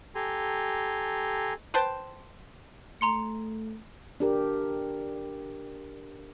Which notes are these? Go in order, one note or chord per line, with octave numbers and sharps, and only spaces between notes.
G4 A4 G#5 A#5 C6
B4 C5 G5 A5
A3 A#5 C6 C#7
D4 G4 A#4